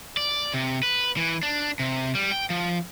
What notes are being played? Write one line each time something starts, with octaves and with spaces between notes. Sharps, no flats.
D5
C3
B4
E3
D4
C3
G3
G5
F3